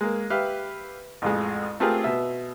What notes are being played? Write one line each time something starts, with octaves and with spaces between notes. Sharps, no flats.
G#3 A#3
G4 B4 E5 F5
A1 F2 G#3
A3 C4 F4 G4 G#4 A#4
B2 E5